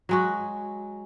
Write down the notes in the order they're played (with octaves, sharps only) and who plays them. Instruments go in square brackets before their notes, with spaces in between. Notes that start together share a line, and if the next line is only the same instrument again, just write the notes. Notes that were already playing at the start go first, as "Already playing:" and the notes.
[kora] F#3 G#3 F#4